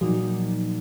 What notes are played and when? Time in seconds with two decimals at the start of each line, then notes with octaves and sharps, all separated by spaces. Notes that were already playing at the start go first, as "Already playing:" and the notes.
0.01 A#2 F3 F#3 A#3 D#4 F#4